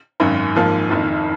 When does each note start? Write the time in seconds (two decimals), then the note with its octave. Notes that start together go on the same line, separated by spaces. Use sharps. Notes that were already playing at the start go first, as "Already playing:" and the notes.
0.20 G#1 F#2 D#3
0.55 G#1 G#2 F3 A#3
0.89 F#1 F2 D#3